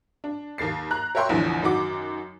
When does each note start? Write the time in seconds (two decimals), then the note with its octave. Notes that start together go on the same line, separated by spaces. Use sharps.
0.24 D4
0.58 D#2 A#3 A6 C7
0.91 A#5 F#6
1.15 A#4 C#5 E5 G5 C6 C#6
1.29 A1 E2 A2 D3 F3
1.63 F#2 D#3 F#4 D6